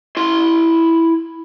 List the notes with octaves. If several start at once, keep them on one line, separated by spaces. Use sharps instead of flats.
E4 C6